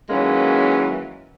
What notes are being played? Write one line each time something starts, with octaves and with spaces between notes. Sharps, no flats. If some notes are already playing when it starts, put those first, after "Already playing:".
D#3 E3 F#3 G#3 A#3 C#4